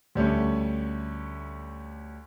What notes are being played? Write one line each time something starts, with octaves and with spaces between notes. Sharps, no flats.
D2 G3 A3 C#4